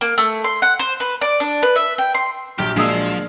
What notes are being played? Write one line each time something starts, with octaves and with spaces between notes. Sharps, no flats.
A#3
A3
C6
F#5
C5
B4
D5
D4
B4
E5
G5
C6
A#1 F#3 G4 G5 F6
F3 G#3 A#3 D4 D#6 E6